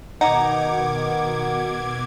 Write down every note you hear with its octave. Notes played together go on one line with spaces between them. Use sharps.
B2 D#3 D#4 F#5 D6 G#6